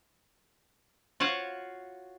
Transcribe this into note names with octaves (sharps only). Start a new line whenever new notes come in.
F4 F#4 C#5 F5 F#5